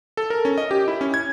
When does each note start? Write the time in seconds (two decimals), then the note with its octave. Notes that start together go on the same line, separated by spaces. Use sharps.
0.17 A4
0.30 A#4
0.45 C#4
0.58 D#5
0.71 G4
0.88 E4
1.01 C#4
1.14 G#6